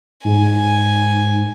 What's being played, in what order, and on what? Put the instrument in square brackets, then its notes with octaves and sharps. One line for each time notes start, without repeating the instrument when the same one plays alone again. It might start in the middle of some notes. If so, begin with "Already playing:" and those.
[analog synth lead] G#2 [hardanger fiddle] G#5